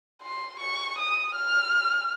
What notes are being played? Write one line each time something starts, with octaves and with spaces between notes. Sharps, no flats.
C6
C#6
D#6
F6